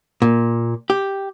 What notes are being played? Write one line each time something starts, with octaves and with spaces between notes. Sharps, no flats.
A#2
G4